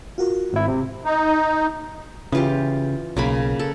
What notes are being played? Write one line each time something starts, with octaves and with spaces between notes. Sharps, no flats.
F4 F#4 A#4
G#1 E4
C3
D#4
C#3 E3 F4 G4
B1 C#3 A#3 B5
A4